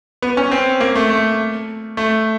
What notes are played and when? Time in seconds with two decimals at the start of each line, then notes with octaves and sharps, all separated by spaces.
0.22 B3
0.37 C#4
0.51 C4
0.81 A#3
0.95 A3
1.10 A3
1.97 A3